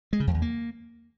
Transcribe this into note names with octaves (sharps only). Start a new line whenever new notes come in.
G#3
C#3
F2
E2
A#3